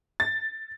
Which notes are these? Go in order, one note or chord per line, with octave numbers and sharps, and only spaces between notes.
A6